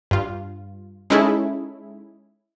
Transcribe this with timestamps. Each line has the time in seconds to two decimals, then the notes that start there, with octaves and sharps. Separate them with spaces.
0.11 G2 F4
1.10 G#3 C#4 D#4 E4 G#4 A4